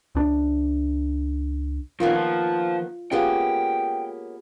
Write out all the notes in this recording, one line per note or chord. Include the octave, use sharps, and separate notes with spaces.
C#2 D4
D#3 F3 A#3 B3 C#4 F4
F3
A#3 B3 C#4 F4 G4 G#4 G5